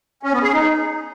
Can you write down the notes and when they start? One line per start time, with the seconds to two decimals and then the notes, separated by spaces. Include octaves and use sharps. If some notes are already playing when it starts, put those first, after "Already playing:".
0.23 C#4
0.33 B3
0.43 G#4
0.53 D#4